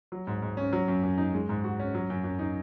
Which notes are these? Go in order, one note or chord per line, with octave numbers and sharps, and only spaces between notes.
F#3
G#2
G#2
C#4
F#3
F#2
F#2
D#4
G#3
G#2
F#4
C#4
F#3
F#2
F#2
D#4